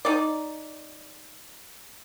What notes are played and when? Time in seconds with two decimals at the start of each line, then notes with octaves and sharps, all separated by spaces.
0.05 D#4 D5